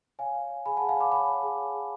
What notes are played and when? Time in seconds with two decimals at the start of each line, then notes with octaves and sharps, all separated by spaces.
0.19 C#5 F5 G#5
0.34 C#5
0.50 C#5
0.66 G#4 G#5 B5
0.77 G#4 F#5 A5
0.89 F5 G#5
0.96 C#5 B5 D6
1.12 C#5 G#5 B5
1.27 C#5
1.43 G#4
1.58 C#5
1.74 G#4